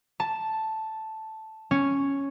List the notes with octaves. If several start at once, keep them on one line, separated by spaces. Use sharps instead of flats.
A5
C#4